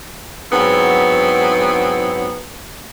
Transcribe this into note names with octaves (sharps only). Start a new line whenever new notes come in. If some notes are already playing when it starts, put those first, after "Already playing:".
G#2 F#3 B3 C4 E4